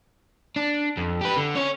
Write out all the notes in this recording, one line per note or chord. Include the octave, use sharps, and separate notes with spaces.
D4
F2
G4 B4
D3
C#4 C#5